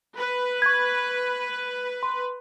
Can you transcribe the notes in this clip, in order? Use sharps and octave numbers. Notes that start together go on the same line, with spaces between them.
B4
C#6 G#6
C6